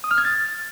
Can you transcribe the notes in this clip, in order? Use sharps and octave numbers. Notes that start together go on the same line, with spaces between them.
D#6
F6
G#6
A6